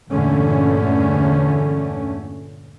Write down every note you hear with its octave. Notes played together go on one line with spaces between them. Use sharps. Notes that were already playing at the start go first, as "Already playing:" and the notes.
E2 G2 A#2 D3 A3 C#4